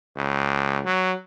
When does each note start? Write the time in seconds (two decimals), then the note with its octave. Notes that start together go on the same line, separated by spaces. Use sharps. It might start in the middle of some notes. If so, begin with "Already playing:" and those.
0.16 C#2
0.85 F#3